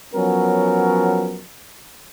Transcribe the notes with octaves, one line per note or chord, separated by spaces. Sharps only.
F3 F#3 B3 C#4 A#4